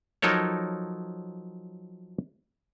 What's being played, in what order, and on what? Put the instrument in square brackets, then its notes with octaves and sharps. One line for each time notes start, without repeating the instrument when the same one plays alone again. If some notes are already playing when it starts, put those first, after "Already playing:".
[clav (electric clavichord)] F3 F#3 D#4 A4 A#4 C#5